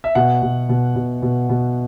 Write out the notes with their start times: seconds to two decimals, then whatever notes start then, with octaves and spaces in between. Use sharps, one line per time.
0.04 E5
0.15 B2 F#5
0.42 B2
0.69 B2
0.96 B2
1.22 B2
1.50 B2